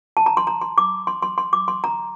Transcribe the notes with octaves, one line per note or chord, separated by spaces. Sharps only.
A5
A#5
C6
A#5
C6
D6
C6
C6
C6
D6
C6
A#5